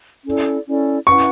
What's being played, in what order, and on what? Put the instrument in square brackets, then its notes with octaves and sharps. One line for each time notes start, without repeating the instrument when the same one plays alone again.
[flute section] C#4 E4 A4 D5
C#4 E4 A4 D5
[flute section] C#4 E4 B4 F#5 [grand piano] C#6